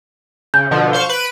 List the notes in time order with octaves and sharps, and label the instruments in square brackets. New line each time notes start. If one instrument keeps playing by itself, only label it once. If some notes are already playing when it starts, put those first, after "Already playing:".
[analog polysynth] C#3 [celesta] G6
[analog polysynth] B2 D3 F3
C5 F5 C#6
B4 D7